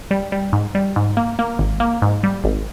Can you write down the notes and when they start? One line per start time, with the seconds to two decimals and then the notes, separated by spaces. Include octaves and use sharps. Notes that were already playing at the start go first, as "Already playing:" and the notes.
0.11 G3
0.32 G3
0.53 G#2
0.75 G3
0.96 G#2
1.17 A#3
1.39 A#3
1.59 G#1
1.80 A#3
2.02 G#2
2.23 G3
2.44 G#1